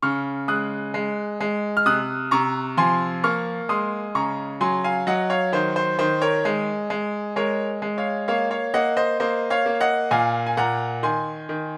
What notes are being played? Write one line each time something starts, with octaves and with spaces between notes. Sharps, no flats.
C#3 C#6 F6
G#3 D#6 F#6
G#3
G#3
F6
C3 D#6 F#6
C3 A#5 C#6
F3 G#5 C6
A#3 C#6 F6
G#3 C6 D#6
C#3 A#5 C#6
F#3 G#5 C6
F5 G#5
F#3 D#5 F#5
C#5 F5
D#3 C5
C5
D#3 C5
A#4 C#5
G#3
G#3
G#3 A#4 C#5
G#3
C#5 F5
A#3 C#5 F5
C#5 F5
A#3 D#5 F#5
C5 D#5
A#3 C5 D#5
C#5 F5
A#3
D#5 F#5
A#2 F5 G#5
G#5
A#2 F#5 A#5
D#3 G#5 C6
D#3